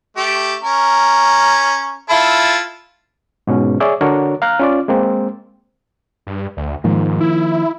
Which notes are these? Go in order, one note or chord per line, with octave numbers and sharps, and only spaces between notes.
A3 G4
C#4 A#4
E4 F4 A4
G#2 B2 C#4
G#4 C#5 D5 E5
D3 D4 F#4 A#4 C#5
F5 A#5 F6 F#6
C#4 F4 D5
G#3 A#3 C4
G2
D2
G#2 D#3 F3 A#3
E4